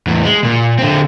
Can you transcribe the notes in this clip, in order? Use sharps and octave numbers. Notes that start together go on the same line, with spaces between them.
E2 A2
G#3
A#2
D3 C4